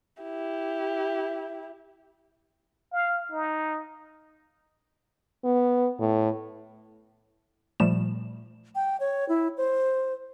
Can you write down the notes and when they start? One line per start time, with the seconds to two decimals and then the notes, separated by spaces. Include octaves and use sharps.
0.23 E4 G4
2.93 F5
3.32 D#4
5.45 B3
6.00 A2
7.80 A#2 F3 G3 A3 E7
8.75 G5
9.00 C#5
9.29 E4
9.57 C5